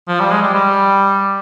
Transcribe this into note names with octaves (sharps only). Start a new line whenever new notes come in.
F3
G3
G#3
G3
G3